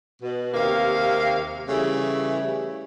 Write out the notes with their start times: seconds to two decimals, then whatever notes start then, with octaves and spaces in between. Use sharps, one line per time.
0.23 B2
0.54 D#2 C3 A#3 F5
1.69 C#3 E3 G3 A3